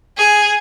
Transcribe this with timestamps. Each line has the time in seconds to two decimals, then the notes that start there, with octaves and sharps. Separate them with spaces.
0.17 G#4